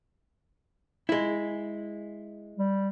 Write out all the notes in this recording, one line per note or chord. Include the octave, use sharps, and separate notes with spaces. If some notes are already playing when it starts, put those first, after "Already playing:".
G#3 E4
G3